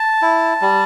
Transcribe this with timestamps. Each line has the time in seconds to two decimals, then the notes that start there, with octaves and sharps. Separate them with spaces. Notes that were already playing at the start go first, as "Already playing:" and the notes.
Already playing: A5
0.22 E4
0.61 G3